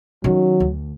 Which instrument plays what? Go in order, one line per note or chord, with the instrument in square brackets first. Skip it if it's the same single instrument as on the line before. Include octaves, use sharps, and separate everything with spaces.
[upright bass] D#3 C#4 [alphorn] F#3
[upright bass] D2